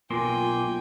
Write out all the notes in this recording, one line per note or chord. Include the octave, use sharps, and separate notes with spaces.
B1 A#3 F4 G5 G#5 C6